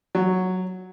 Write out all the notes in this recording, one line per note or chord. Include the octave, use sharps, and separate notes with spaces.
F#3